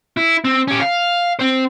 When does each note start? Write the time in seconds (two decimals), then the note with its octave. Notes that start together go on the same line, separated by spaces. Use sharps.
0.17 E4
0.44 C4
0.68 C#4 G4
0.81 F5
1.39 C4 C5